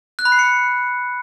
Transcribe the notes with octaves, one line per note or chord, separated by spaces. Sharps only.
F#6
B5
C7
C#7